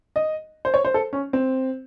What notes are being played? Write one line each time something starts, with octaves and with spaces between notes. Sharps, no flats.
D#5
C5
C#5
C5
A4
C#4
C4